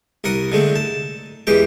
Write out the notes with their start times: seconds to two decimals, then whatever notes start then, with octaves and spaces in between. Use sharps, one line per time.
0.24 C2 A#4 F#5 D#6
0.52 D3 G#3 A3 C4
0.76 A5
1.47 E2 E3 G#3 G4 G5